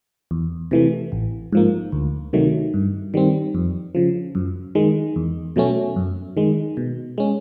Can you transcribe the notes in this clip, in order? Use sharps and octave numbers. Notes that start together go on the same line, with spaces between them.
E2
C3 E3 A3
A1
G#2 F3 A#3
D2
C3 D#3 F#3 A3
G2
D#3 G3 C4
F2
C#3 F3
F#2
D#3 G#3
E2
B2 F#3 A3 C#4
F#2
D#3 G#3
B2
G#3 C#4